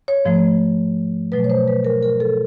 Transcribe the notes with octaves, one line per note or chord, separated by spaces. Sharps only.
C#5
G#2 F3 A3
B2 F#3 A3 B4
C#5
C5
B4
A#4
A#4
A4